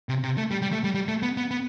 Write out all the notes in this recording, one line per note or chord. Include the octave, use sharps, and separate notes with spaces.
C3
C3
A3
G3
G3
A3
G3
G3
A3
B3
B3
B3